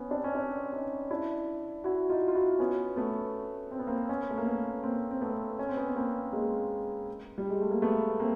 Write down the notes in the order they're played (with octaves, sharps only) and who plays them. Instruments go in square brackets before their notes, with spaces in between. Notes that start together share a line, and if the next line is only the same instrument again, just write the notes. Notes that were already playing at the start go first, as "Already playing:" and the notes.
Already playing: [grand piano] B3 C#4
C4 D4
C#4
C4 D4
C#4 D#4
D4 E4
E4 F#4
D#4 F4
F4
E4 F#4
B3 C#4
A3 B3
C4
B3
A#3 C4
B3 C#4
A3
A#3
A3 B3
A#3 C4
C4
A3 B3
C#4
C4
B3 C#4
B3
A#3 C4
G#3 A#3
G3
G#3
A3
A#3
A3 B3
A#3 C4